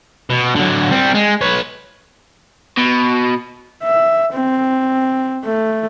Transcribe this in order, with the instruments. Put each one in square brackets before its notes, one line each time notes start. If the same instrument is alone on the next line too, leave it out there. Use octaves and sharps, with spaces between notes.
[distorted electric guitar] B2
D3 F#3
G3 C4
G#3
B4 C#5
[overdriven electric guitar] B2
[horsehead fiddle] E5
C4
A3